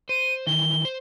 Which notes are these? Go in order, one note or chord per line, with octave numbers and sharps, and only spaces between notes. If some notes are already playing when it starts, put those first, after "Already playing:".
C5 D#7
D#3 E3 G7
C5